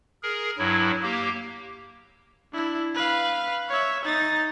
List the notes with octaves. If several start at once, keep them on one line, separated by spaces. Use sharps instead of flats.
G#4 A#4
G2 F#3 E4
A#3 G4
D4 E4
B4 F5
C#5 E5
D#4 A6